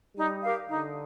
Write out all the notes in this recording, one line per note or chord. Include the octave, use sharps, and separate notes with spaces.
G3 D#4
G4 A#4 F5
D3 D#4